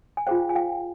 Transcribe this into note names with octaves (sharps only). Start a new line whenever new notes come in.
G#5
F4 G#4 C5 F5 G5
G#5
F5 G5